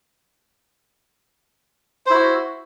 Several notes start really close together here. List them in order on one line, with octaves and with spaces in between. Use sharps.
C5 E4 F#4